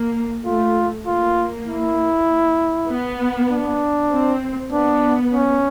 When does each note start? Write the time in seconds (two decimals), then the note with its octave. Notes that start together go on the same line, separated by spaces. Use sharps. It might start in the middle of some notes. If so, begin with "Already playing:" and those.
Already playing: A#3
0.45 A3 F4
1.06 A#3 F4
1.67 E4
2.89 B3
3.50 D4
4.12 C4
4.72 B3 D4
5.33 C#4